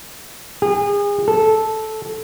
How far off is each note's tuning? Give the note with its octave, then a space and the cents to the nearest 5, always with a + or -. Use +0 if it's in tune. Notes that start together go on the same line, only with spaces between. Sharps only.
G#4 -35
A4 -10